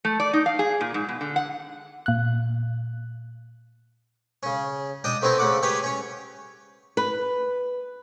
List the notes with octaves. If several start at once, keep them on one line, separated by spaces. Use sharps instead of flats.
A3
D5
D#4
F5
G#4
A#2
G#2
B2
D3
F#5
A#2 F#6
C#3 C#4
D4 D#5 G5 D#6
A3 B3 C4 D#4 E4
C#3 A3 F#5 D6
G4 G#4 B4 C#5 G5
C#4 C#5
B4